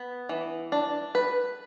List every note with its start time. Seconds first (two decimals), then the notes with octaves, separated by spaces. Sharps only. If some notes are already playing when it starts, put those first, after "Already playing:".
Already playing: B3
0.29 E3
0.72 D4
1.15 B4